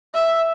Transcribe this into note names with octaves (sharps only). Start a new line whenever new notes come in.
E5